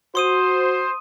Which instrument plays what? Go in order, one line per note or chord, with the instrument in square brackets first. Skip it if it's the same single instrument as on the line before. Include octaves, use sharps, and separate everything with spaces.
[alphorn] F#4 [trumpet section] C5 [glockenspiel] C6 D#6 D#7